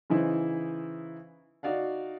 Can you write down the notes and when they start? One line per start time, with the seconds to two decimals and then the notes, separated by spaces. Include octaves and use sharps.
0.10 C#3 E3 D#4 E4 C5
1.63 D#4 F#4 D5 F5 F#5